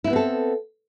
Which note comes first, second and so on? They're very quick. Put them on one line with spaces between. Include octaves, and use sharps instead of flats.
E4 D#4 B3 C4 A4